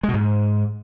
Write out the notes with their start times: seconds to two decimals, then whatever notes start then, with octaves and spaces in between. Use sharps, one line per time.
0.03 G#3
0.09 B2
0.14 G#2